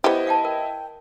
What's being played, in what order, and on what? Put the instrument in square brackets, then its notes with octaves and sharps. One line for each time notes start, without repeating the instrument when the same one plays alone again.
[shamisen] B3 G4 [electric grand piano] E4 D#5 [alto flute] C5
[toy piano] F5 G5 A5
[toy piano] A#4 [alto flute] G5